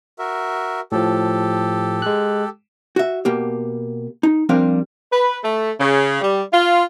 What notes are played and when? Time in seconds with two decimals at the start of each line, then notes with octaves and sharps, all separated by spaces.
0.19 F#4 A#4 E5
0.92 A2 F3 G4 A4
2.02 G#3 F#6
2.96 F#4 E5
3.25 B2 A#3 G4
4.23 D#4
4.49 F3 G3 C4 D4 A#4 F5
5.12 B4
5.44 A3
5.79 C#3
6.21 G3
6.53 F4